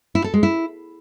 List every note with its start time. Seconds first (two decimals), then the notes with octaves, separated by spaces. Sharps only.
0.15 E4
0.24 A4
0.34 G#3
0.43 E4